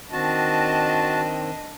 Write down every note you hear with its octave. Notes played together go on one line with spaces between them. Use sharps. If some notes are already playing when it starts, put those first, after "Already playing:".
D#3 C4 D4 F#4 D#5 A5